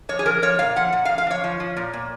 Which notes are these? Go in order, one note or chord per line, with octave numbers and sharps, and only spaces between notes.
F3 C#5
G#4
F3 A#4
F3 C#5
A#2 F5
F3 F#5
A#2
F5
F3
F5
F3 C#5
F3
F3
A#2
A#2